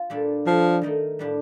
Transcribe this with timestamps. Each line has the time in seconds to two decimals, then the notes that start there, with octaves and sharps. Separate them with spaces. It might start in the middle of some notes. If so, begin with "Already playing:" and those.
Already playing: F4
0.10 A#2 G3 D4 A4
0.46 F3 G3 D4 A4
0.82 D#3 A3 D#4 A#4 D#5
1.19 A2 G3 D4 G4